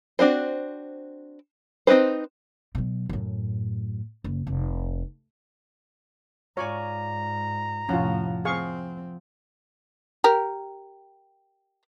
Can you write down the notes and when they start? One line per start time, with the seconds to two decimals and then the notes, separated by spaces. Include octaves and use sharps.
0.19 C4 D4 F#4 C5
1.87 C4 D#4 F#4 B4 C5
2.75 B2 F#3
3.09 F#2 A2
4.24 F#1
4.47 F1
6.57 G#2 F4 C#5 D5 G#5 A#5
7.89 F1 A2 F3 C#4 F4 F#5
8.45 C4 G#4 F5 C#6
10.24 G4 A#4